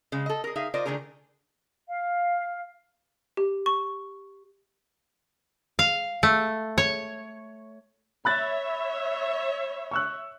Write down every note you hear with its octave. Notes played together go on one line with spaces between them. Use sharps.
C#3 G#3
A4 D#5
G#4 A#4
D#4 G#4 E5 F5
F4 A#4 C5 D5 D#5
D3 D#3 A3 G#4 A#4
F5
G4
C#6
F5
A3
C#5
C#5 E5 B5 F#6 A6
C#6 E6 F#6